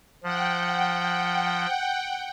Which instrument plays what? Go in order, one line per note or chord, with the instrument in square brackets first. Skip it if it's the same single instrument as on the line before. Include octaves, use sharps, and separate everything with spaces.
[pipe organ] F3 [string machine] F#5 G5